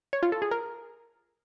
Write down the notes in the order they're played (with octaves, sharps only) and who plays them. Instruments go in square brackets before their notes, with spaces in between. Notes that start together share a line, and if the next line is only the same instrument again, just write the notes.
[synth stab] C#5
F4
A4
G#4
A#4